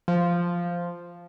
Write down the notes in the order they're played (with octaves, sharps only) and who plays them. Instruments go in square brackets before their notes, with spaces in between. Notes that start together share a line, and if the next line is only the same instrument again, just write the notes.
[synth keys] F3